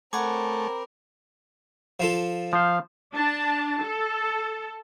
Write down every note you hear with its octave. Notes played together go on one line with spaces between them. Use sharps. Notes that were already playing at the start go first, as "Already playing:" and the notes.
A3 C4 A#4 C#5 F#5 G#5 B5 D6
F3 F4 A4
F3 C5 F5
D4 A5
A4